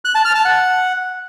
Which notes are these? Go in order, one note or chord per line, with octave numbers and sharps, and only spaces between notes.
F#6
A5
F6
A5
F#5